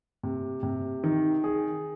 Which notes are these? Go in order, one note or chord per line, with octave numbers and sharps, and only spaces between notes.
C3
C3
D#3
G#4